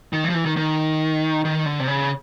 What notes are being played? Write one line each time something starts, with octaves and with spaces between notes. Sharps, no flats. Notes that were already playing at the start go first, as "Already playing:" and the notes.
D#3
E3
F3
E3
D#3
D#3
D#3
D3
C3
C#3